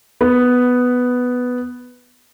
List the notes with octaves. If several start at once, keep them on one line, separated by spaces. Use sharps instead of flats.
B3